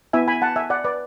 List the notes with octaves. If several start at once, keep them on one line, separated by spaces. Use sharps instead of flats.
B3 E4 E5 G#5
G#5 B5
F#5 A5
E5 G#5
D5 F#5
B4 D5